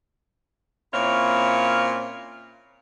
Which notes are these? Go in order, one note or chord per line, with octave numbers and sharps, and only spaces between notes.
A#2 C4 C#4 E4 C#5 F5